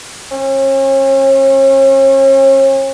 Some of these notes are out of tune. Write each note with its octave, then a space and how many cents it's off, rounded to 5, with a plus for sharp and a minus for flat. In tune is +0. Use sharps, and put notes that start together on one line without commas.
C#4 -40